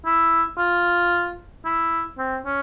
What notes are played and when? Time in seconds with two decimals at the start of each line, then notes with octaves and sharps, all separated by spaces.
0.06 E4
0.58 F4
1.65 E4
2.18 C4
2.46 C#4